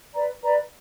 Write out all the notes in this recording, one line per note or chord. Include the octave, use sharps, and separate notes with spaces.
B4 D5 A#5
B4 D5 A#5